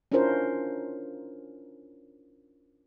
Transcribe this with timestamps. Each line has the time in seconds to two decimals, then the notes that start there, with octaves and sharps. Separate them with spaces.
0.12 C#4 D4 E4 F4 A#4 C5